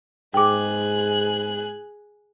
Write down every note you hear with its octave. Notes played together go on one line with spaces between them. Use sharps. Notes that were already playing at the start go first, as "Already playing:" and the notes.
G#2 G#4 G5 D6 F#6